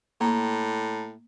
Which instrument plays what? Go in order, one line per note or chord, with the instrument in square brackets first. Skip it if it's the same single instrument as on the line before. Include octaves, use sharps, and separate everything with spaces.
[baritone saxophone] A2 [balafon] A#3 [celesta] A#5